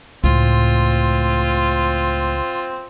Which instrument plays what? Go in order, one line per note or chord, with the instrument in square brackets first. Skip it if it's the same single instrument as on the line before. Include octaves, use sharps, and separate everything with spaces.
[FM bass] C#2 [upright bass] A2 [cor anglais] C4 [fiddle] F4